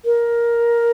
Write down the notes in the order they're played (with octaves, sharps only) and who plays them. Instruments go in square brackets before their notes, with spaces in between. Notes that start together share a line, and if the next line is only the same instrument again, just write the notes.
[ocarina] A#4